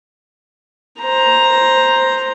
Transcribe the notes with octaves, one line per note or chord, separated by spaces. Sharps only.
C5 A#5